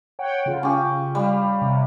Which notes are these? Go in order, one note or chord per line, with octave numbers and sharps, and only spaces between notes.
C#5 F#5 G5
C#3 F4
C#4 G4
G3 F5
C3